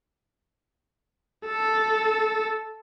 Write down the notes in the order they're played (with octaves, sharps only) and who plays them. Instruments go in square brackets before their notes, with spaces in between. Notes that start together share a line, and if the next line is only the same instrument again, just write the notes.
[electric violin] A4